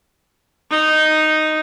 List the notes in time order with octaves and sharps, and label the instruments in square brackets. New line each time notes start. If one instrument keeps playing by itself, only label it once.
[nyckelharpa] D#4